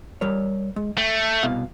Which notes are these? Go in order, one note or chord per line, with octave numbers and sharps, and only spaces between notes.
G3 A#4 C#5
G#3
A3 G5
C2 B2 F5